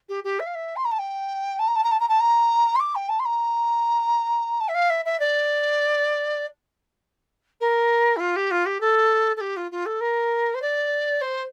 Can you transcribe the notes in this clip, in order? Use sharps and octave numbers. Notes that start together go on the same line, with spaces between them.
G4
G4
E5
F5
E5
C6
A#5
A5
G5
A5
A#5
A5
A#5
A5
A#5
A5
A#5
C6
D6
G5
A5
C6
A#5
A5
E5
F5
E5
E5
D5
A#4
E4
F4
G4
F4
G4
A4
A4
G4
F4
F4
A4
A#4
C5
D5
C5